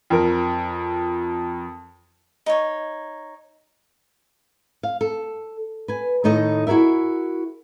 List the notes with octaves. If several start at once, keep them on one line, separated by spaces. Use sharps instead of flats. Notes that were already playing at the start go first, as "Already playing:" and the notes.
F2 A#4
D#4 C#5
F5
A4
B4 G#5
A2 D#3 D#4 A4 D#5
E4 F#4 G#4 A#4 E5